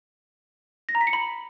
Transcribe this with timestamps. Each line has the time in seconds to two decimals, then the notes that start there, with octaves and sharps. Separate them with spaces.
0.89 A#6
0.95 A#5
1.01 B6
1.07 C#7
1.13 B5